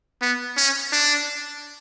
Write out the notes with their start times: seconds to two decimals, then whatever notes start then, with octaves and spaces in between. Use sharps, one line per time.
0.22 B3
0.57 C#4
0.93 D4